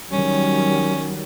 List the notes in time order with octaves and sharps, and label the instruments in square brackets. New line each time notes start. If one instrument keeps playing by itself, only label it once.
[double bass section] D#3 F#3 G3 [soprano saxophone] C#4